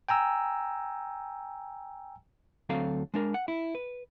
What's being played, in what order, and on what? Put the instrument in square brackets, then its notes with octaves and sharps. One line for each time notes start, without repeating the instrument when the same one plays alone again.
[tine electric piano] G5 G#5 A#5 E6
[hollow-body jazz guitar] D2 F#3 C4 A4 F5 A#5
G#3 D4 A#4
F#5
E4
B4